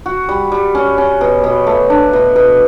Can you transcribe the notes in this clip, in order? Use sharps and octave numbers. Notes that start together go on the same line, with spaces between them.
F#4
G3
G3
C#4
C#4
B2
B2
A3
D4
B2
B2